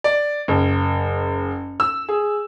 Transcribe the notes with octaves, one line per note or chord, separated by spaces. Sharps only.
D5
F#1
E6
G#4